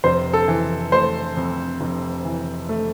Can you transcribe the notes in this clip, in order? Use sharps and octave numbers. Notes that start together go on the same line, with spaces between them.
F1 C5
A4
E3
A3 C5
F2
F1
E3
A3